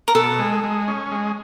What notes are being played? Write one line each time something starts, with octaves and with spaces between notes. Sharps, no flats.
A#4
B2 A4
G#3
G#3
C#4
G#3